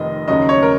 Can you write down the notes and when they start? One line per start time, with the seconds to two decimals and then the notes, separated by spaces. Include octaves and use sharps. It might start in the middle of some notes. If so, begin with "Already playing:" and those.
Already playing: F1 F2 D#3 D#5
0.28 D#2 C#3 F#3 D#5
0.49 C#5
0.63 A#4